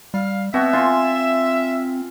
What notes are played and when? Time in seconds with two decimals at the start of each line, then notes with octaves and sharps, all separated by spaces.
0.14 G3 F5
0.54 B2 C4 F#4 E5
0.73 F4 G#5 C6